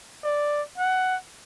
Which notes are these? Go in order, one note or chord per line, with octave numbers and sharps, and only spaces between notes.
D5
F#5